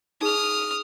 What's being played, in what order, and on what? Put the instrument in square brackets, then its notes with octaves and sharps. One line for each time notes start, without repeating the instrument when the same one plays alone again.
[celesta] D#4 G#4 [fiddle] D#6 F6